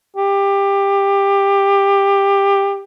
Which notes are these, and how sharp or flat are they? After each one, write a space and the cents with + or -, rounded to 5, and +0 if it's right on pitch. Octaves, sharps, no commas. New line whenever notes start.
G4 +20